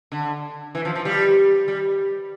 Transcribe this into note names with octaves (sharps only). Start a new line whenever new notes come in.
D3
E3
F3
F3
G3
G3